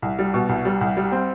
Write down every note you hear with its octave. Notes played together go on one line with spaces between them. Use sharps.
C2
G3
B2
C2
G3
C2
G3
C4